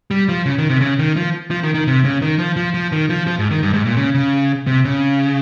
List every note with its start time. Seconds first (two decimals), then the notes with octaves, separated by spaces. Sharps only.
0.11 G3
0.29 F3
0.46 C#3
0.58 D#3
0.69 C3
0.81 C#3
0.99 D#3
1.16 F3
1.51 F3
1.63 D#3
1.75 D#3
1.87 C3
2.05 C#3
2.22 D#3
2.39 F3
2.56 F3
2.74 F3
2.92 D#3
3.10 F3
3.27 F3
3.39 G#2
3.51 D#3
3.63 G2
3.73 G#2
3.86 A#2
3.97 C#3
4.14 C#3
4.67 C3
4.85 C#3